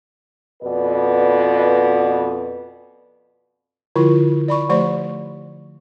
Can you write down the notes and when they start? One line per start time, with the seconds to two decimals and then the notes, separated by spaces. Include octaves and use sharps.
0.62 F2 B2 B4 D5
3.96 D3 F3 E4 F4 C#6
4.48 D5 B5 C#6
4.70 F3 A3 G4 C5 D5 C#6